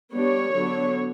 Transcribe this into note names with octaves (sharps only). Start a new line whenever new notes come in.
G3 B3 D4 C#5
D3 F#3 B3 D4